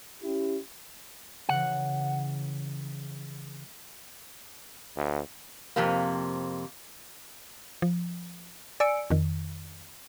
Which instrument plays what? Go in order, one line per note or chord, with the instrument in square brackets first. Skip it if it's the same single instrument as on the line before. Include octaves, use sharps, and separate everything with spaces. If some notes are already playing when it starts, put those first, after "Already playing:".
[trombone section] C#4 E4 G4
[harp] C#3 E3 [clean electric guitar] F#5
[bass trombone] D2
[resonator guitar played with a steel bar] F2 C3 A#3
[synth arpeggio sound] F3
D5 G#5 E6 C#7 D7
F2 D#3